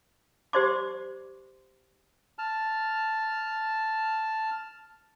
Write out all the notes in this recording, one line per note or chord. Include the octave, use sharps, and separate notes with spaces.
G4 C5 D5 C6 D6
A5 F6